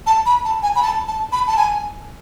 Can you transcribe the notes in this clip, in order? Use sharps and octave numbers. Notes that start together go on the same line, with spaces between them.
A5
B5
A5
G#5
B5
A5
A5
B5
A5
G#5